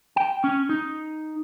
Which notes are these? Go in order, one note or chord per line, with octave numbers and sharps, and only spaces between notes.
G5
C#4
D#4